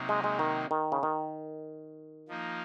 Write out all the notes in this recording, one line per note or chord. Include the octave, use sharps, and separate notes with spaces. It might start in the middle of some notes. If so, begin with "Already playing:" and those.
Already playing: C3 F#3 A#3 D#4
G#3
G#3
D#3
D#3
C#3
D#3
F3 A#3 D#4